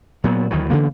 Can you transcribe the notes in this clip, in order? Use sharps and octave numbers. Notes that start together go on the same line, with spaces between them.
A#2 F#3 B3
D2 D#3 E3 F#3
C#3 E3 A#3 B3